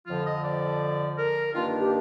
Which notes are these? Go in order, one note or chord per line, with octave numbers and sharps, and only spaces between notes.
F2 D3 F3 F4
D#5
D5
A#4
G2 D#3 A#3 D4 F4
G4